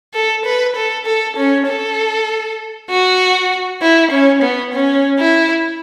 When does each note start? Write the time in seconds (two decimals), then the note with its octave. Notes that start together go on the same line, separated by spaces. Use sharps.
0.14 A4
0.45 B4
0.76 A4
1.06 A4
1.37 C#4
1.67 A4
2.90 F#4
3.81 E4
4.11 C#4
4.42 B3
4.73 C#4
5.19 E4